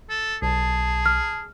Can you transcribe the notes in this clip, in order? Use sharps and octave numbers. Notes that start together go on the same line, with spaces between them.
A4
B1 G#4 A5
F6